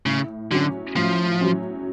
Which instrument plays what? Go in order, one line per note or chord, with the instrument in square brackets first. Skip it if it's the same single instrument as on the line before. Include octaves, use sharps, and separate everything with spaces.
[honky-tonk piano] A2 [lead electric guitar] C#3
[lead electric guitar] D3 [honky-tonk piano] F#3 C#4
[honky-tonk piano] A2 [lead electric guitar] F3
[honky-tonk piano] F#3 C#4